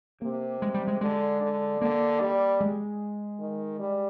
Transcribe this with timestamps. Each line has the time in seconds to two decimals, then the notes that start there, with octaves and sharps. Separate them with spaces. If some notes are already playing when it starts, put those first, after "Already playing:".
0.21 C3 A#3
0.62 G#3
0.74 G3
0.87 G#3
1.01 D3 G#3
1.41 D3
1.81 D3 A#3
2.21 G3
2.60 G#3
3.40 D#3
3.80 G3